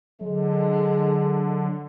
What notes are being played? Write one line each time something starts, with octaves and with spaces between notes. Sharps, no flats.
D3 F#3 G#3